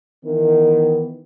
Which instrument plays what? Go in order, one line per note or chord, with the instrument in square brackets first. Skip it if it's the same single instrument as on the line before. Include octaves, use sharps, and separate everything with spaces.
[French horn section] D#3 E3 B3